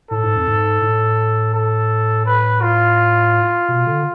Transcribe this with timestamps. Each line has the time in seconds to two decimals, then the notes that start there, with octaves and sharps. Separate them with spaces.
0.10 A2 A4
0.23 G#2
0.36 F2
0.48 G#2
0.82 A2
1.54 A4
2.26 B4
2.62 F4
3.68 B2
3.87 D3